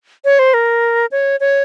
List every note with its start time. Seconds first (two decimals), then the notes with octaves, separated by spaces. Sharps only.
0.25 C#5
0.39 C5
0.54 A#4
1.11 C#5
1.40 C#5